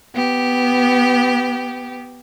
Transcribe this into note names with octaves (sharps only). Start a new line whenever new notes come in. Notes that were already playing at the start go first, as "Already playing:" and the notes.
B3 G4